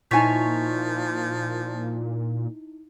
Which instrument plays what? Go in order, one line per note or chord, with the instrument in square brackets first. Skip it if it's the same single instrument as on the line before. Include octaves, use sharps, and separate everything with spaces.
[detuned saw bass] A#2 [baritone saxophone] F3 [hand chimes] D#4 E4 B6 [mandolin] C#5 G#5